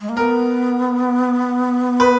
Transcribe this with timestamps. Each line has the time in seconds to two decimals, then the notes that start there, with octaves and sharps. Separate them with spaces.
0.01 G#3
0.09 A#3
0.17 B3 A#4
2.00 B4